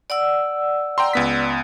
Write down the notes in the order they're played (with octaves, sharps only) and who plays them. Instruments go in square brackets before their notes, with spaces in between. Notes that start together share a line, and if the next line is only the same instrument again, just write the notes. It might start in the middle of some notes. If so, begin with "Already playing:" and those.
[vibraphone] D5 F#5 E6
[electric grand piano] G5 A#5 C6
C#2 B3 B6